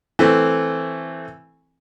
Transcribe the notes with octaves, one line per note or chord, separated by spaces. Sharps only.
E3 A3 C4